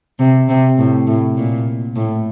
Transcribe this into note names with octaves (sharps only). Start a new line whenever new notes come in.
C3
C3
A2
A2
A#2
A2